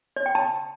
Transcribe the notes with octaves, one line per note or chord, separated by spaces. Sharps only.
D5
G5
A5